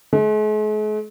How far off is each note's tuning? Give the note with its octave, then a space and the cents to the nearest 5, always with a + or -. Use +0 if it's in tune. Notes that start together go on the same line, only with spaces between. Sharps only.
G#3 +45